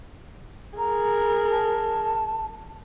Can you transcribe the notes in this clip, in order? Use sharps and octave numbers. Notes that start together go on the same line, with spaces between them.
G#4 A#4 A#5
A5